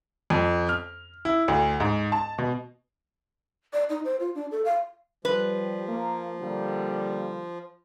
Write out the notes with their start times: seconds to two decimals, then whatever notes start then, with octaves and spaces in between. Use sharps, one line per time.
0.30 F2
0.69 F6
1.25 E4
1.48 D2
1.80 G#2
2.12 A5
2.38 B2
3.73 D5
3.90 D#4
4.05 C5
4.20 F4
4.35 D4
4.51 A4
4.65 F5
5.25 F3 G3 B4
5.88 A#3
6.40 D3 G3 A#3